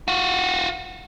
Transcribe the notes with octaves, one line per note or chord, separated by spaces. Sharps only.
F4 F#4